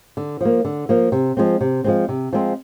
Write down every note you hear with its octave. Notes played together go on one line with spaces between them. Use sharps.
D3
F3 A#3
D3
F3 A#3
C3
F3 G#3 C4
C3
F3 G#3 C4
C3
F3 G#3 C4